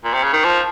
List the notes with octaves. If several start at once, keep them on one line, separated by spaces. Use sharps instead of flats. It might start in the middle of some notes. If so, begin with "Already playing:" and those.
A#2
C3
C#3
D#3
F3